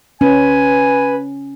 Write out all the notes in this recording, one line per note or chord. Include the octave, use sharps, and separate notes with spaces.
C#4 B4 G#5